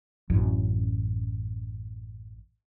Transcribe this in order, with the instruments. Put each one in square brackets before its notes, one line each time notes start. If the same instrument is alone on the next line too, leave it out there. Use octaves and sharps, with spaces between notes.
[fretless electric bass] A1 F#2